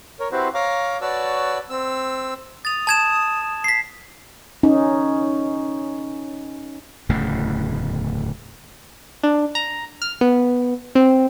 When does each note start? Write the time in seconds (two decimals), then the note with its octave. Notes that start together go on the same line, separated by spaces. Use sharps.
0.20 A#4 C#5
0.32 C4 E4 F#4 G4 B4 C5
0.54 C#5 F5 A#5 D6
1.01 F#4 B4 C#5 D5 A5 E6
1.70 C4 E6
2.65 D#6 A6 F7
2.87 A5 G#6 E7
3.64 B6 C7
4.63 C#4 D#4
7.09 D1 E2 C#3 A3
9.23 D4
9.55 A#5
10.02 F6
10.21 B3
10.95 C4